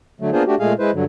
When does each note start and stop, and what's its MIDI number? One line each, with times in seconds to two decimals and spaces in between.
0.21 0.30 50
0.21 0.30 54
0.21 0.30 57
0.33 0.43 58
0.33 0.43 59
0.33 0.43 62
0.33 0.43 65
0.33 0.43 68
0.33 0.43 72
0.47 0.55 57
0.47 0.55 62
0.47 0.55 66
0.47 0.55 67
0.59 0.73 46
0.59 0.73 56
0.59 0.73 57
0.59 0.73 68
0.59 0.73 77
0.79 0.91 56
0.79 0.91 64
0.79 0.91 71
0.79 0.91 72
0.94 1.04 43
0.94 1.04 50
0.94 1.04 54